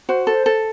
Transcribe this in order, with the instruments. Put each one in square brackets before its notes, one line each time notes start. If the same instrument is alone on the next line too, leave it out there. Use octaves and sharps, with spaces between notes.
[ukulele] F#4 [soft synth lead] C5
[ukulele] A4
A4